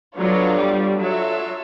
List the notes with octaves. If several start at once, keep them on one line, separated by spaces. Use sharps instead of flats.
F#3 B3 D4 F4 A4 C#5
G3
F#3 F4 A4 C#5 E5